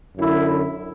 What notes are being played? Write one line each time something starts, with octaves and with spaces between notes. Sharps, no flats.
F#2 D3 E4